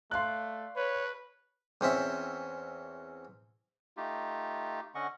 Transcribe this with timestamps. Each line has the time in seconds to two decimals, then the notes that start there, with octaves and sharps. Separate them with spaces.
0.11 A3 D5 F5 C6 F#6
0.76 B4 C#5
1.81 E2 C4 C#4 E5
3.97 A3 D#4 F4 G4
4.95 D3 C#4 D#5 F#5 C#6